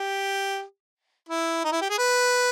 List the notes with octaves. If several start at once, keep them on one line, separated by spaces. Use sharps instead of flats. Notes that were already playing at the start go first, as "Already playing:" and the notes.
Already playing: G4
E4
D#4
E4
G4
G#4
B4